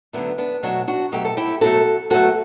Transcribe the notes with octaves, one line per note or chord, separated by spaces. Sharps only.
D3 F#3 A3 B3 D4
B3 D4
B2 F#3 A3 D4 F#4
D4 F#4
B2 F#3 A3 G4
A4
E4 G4
B2 F#3 A3 F#4 A4
B2 F#3 A3 F#4 A4